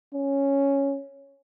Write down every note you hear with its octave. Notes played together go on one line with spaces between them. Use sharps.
C#4